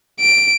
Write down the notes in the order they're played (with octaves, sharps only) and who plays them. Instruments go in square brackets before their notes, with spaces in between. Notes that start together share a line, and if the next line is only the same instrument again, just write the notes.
[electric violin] D7